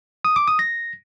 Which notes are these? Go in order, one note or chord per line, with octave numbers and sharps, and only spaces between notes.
D#6
D6
D#6
A#6